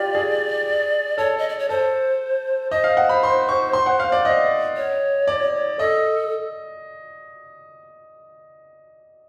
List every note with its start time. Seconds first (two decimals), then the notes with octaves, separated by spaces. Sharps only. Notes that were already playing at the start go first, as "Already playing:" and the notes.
Already playing: F4 G4 D5
0.15 G#4
1.18 A4 C#5
1.38 D#5
1.49 D5
1.59 C#5
1.69 A4 C5
2.71 C5 D#5
2.84 F5
2.97 F#5
3.09 B5
3.23 C6
3.49 C#6
3.73 C6
3.86 F#5
4.00 F5
4.12 D5
4.25 D#5
4.77 C#5
5.27 D5
5.79 A4 D#5